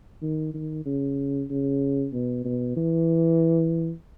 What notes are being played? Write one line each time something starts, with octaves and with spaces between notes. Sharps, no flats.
D#3
D#3
C#3
C#3
B2
B2
E3